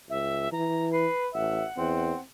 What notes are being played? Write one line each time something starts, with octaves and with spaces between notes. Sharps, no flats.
C#2 E5
E3 A#5
B4 C7
A1 E5 F#5
E2 C4